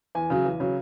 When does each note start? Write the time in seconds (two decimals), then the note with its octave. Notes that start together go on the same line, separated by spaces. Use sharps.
0.15 E2 G#5
0.30 C#3 F#3
0.45 E2
0.60 C#3 F#3